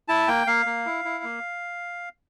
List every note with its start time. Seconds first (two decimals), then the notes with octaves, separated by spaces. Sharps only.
0.08 E4 A5
0.28 A#3 G5
0.47 A#3 F5
0.66 A#3
0.86 E4
1.05 E4
1.24 A#3